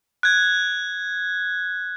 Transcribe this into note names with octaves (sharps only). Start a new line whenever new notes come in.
F#6 G#6